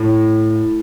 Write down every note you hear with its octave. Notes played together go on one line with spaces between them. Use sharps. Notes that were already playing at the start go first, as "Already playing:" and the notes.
Already playing: A2